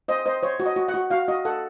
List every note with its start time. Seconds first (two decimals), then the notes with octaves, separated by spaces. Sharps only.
0.08 C5 D#5
0.26 C5 D#5
0.43 C5 C#5
0.60 F#4
0.66 D#5
0.76 F#4
0.88 F#5
0.94 F#4
1.10 F#4 F5
1.28 F#4 D#5
1.45 A4 F#5